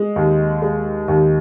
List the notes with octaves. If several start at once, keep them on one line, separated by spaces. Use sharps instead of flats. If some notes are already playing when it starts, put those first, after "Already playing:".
Already playing: G#3
D#2
G#3
D#2